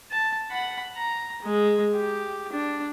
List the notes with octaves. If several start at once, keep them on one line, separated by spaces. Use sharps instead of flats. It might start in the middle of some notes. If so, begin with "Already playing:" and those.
A5
F#5 B5
A#5
G#3
G4
D4